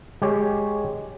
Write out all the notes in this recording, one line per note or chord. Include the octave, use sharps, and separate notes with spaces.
G#3 G4 C#5